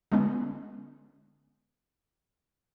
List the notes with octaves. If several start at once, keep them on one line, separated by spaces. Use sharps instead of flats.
D3 G#3 B3 C#4